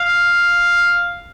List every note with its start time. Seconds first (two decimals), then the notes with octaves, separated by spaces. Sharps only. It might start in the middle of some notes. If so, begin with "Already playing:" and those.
Already playing: F5